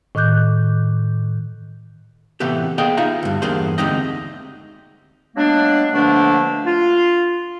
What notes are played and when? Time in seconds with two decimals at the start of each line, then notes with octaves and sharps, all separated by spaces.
0.15 A2 D#3 D6 F#6 G6
2.40 A2 C3 E3 A3 B3 G4
2.78 A#3 B3 G#4 D#5 F#5 G5
2.97 D#4 F4 E5 F5 A#5
3.23 D2 G2
3.42 E2 G2 A#3 D4 G#4 C5
3.78 D2 G#3 C4 D#4 G4 D#5
5.36 F#3 G#3 A#3 B3 D4
5.93 B2 D3 F3 A3 A#3 D4
6.66 F4